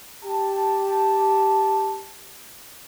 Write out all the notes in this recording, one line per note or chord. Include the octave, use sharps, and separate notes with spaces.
G4 A5